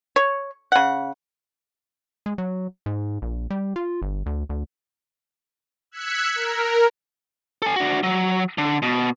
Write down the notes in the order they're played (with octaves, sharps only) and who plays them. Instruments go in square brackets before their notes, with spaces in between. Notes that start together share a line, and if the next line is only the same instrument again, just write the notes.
[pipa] C#5
C#3 F#5
[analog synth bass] G#3
F#3
G#2
A#1
G3
F4
G1
D2
D2
[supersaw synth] E6 F#6 G#6 B6 C#7
A#4
[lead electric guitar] A4 G#5
D4 F#4
F#3
D3
B2